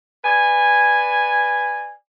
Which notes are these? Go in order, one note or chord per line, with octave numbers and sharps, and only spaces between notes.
B4 D5 G#5